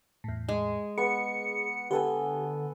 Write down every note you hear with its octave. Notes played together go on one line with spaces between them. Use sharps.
E2 A2
G#3
B3 G#4 C#7
D3 B3 G4 A4 G#5